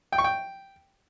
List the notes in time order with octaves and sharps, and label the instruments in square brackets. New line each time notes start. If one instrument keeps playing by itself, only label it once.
[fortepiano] G5
C#6
G5